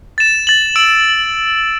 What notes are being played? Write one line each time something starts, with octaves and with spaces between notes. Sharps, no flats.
A6 E7
A6 F#7
E6 D7 F#7